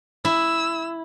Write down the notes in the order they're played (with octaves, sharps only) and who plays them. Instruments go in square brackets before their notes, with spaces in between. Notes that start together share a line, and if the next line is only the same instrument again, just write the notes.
[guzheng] E4 [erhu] E6